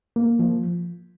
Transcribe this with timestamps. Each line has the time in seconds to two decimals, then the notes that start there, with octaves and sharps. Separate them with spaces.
0.16 A#3
0.39 F3